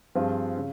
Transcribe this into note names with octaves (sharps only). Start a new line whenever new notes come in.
G2 F3 C4 F4 G#4
C#3